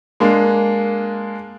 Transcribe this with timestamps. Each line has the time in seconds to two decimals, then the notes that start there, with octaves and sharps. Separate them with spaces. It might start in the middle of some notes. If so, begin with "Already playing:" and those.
0.20 G#3 A#3 D4